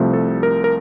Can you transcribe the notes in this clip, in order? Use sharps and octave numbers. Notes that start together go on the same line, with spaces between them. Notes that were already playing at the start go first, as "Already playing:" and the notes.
Already playing: C2 C3 F3 A3
A4
A#4
A#4